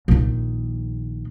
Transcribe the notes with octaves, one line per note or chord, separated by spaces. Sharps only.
A#1 D#3